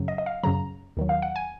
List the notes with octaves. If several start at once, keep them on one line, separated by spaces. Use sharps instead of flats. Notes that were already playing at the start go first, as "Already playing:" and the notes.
Already playing: F#2 C#3 F#3
D#5
D#5
F5
F#2 C#3 F#3 A#5
D#2 D#3 F#3
F5
F#5
G#5